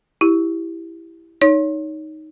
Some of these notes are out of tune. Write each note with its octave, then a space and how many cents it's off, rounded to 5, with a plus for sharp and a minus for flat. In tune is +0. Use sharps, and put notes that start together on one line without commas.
E4 +5 G4 +0
D#4 +0 C#5 +20